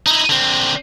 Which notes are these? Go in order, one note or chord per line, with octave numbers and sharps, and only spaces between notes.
D#4 E4
D3 C4